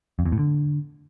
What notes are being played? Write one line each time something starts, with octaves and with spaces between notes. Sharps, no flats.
F2
E2
A2
D3